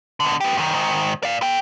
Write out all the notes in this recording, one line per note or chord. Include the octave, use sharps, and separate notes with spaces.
B2 D3
B3 G4
F#2 D#3
G#2 D#3
D5 F5
A4 G5